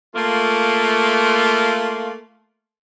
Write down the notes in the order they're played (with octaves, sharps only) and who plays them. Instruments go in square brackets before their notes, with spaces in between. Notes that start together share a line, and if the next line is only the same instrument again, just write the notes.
[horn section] A3 A#3 F4